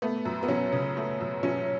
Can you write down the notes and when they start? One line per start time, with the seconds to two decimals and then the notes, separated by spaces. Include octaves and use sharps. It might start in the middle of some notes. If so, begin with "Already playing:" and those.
0.02 A3 B3
0.25 F#2
0.43 B3
0.48 F#3 C#4
0.72 C#3
0.97 A3
1.20 F#2
1.43 F#3 C#4